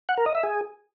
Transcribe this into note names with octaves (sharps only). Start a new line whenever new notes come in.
F#5
A#4
D#5
E5
G#4